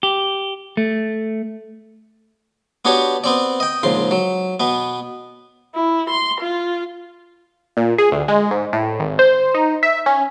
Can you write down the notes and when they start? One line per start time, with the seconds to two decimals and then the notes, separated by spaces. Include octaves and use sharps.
0.03 G4
0.77 A3
2.85 B3 D4 F#4 G4 C#5
3.24 B3 C4 D5
3.60 D#5 G5
3.83 A#1 G#2 C#3 C6
4.11 F#3
4.60 B2 B3
5.74 E4
6.10 C6
6.41 F4
7.77 A#2
7.98 G#4
8.12 D2
8.28 G#3
8.51 G#2
8.73 A2
8.99 G#1
9.19 C5
9.54 D#4
9.83 E5
10.06 C#4